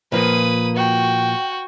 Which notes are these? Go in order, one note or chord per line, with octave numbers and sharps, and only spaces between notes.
A#2 F3 A#3 B4 D#6
F#4 G5